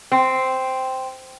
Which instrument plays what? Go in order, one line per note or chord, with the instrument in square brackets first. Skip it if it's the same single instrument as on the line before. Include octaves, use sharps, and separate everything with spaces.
[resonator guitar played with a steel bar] C4